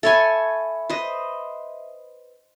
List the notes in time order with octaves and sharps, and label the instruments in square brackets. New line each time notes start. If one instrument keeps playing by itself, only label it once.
[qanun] A4 C#5 G#5 [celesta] E5 B5
[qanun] B4 C5 D#5